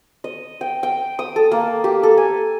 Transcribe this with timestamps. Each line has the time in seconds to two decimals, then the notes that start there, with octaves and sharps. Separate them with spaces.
0.24 D#5
0.61 G5
0.83 G5
1.19 D#6
1.36 A4
1.52 A#3
1.84 G4
2.03 A4
2.17 G#5